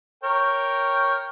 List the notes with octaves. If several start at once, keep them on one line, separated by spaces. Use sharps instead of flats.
A#4 C#5 G5